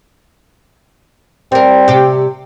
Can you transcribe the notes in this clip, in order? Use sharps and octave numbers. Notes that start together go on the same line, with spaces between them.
G3 C4 A#4
C3 G4